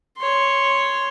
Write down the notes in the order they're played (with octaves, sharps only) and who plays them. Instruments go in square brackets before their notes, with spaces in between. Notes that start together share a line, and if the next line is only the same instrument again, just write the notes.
[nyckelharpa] C#5 C6